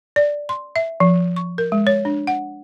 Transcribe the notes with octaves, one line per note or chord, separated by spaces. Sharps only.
D5
C6
E5
F3
C#6
A#4
G#3
C#5
D4
F#5